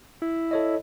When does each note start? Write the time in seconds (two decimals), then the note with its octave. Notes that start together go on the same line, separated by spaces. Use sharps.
0.22 E4
0.51 A4 C#5 D#5